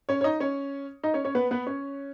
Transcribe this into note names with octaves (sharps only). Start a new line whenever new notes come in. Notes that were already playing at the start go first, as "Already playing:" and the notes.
C#4 C#5
C#5
D#4 D#5
C#4 C#5
D#4 D#5
C#4 C#5
C#4 C#5
B3 B4
B3 B4
C#4 C#5